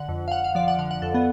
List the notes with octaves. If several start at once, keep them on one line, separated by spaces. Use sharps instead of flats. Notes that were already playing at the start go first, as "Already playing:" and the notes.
Already playing: D3 F#5
F2
F5
F2 F#5
F5
F3 D5
F#5
D3 F5
F#5
F2 A4
B3